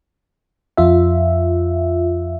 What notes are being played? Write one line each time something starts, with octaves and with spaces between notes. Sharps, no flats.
F2 F4 E5